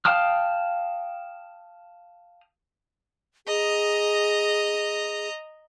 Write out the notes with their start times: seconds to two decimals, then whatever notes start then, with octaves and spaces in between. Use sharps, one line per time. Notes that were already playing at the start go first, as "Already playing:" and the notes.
0.05 F5 G5 A5 D#6 F6
3.47 G#4 D#5 A#5